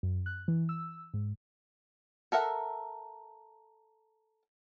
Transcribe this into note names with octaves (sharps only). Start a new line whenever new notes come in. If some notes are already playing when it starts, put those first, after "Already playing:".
F#2
F#6
E3
E6
G#2
A4 A#4 E5 F#5